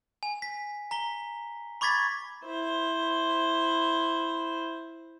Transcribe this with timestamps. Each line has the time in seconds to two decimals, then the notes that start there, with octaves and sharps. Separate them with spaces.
0.23 G#5
0.42 B6
0.91 A#5 B6 G7
1.81 B5 C#6 D6 G#6 A6 B6
2.45 E4 C5